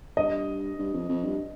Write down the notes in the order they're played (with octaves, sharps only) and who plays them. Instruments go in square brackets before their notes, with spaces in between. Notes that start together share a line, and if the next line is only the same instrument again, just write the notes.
[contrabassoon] G2 [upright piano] D#5
[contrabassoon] G2
F2
F2
G2